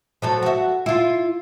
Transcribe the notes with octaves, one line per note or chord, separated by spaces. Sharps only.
F3 F#3 A4
F#4 E5
E4 F4